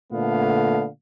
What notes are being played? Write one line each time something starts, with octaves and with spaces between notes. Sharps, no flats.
A#2 D3 A3 B3 F5